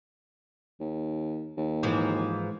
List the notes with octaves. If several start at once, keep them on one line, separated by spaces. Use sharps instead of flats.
D#2
D#2
G#2 E3 F3